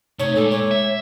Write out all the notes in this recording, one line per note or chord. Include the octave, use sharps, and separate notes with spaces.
C3 A3 D#4 C#5
A#2 G#3 A4 D6
C#5
E5